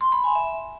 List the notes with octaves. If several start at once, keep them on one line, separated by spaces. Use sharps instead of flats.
C6
B5
G#5
E5